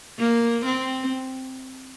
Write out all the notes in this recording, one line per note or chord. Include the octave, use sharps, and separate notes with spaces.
A#3
C4